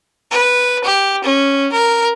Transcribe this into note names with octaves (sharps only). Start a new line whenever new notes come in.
B4
G4
C#4
A#4